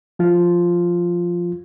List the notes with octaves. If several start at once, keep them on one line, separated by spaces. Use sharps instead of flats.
F3 F4